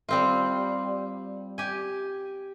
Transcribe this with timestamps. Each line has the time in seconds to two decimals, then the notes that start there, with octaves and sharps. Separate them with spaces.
0.09 G3 C4 F4
1.58 G4 G#5